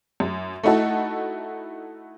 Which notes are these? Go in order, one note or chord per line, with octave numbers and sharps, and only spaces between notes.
F#2
A3 D#4 E4 F#4 A4